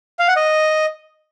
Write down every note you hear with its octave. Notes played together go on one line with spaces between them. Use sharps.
F5
F#5
D#5